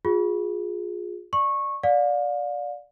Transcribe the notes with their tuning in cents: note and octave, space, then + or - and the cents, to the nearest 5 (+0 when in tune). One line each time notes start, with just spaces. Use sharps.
F4 +30 G#4 -5
D5 +15 C#6 -15
D5 -5 F5 +35